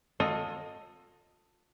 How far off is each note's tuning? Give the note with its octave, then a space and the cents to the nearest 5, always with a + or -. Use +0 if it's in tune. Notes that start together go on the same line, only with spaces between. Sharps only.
F4 +35 A4 +15 D#5 +0